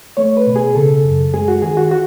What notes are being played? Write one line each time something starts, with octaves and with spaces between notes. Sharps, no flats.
A3 C#5
B4
B2
G#4
C#3 A4
F#2
G#3 G#4
F#4
D#3 G#4
F#4
F#4